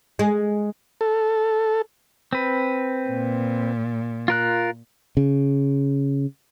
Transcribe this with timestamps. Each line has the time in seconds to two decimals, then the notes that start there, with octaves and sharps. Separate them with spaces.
0.19 G#3
1.01 A4
2.33 C4 B4
3.09 A#2
4.28 F4 A#4 F#6
5.17 C#3